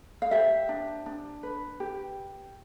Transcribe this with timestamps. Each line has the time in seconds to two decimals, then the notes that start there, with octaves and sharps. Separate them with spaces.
0.22 F5
0.31 G4 C5 E5
0.69 D4
1.06 D4
1.43 B4
1.80 G4